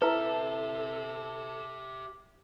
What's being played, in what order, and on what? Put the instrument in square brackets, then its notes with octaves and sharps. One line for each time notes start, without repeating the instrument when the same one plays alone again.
[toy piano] E4 B4 [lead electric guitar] G4 E5 [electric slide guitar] A4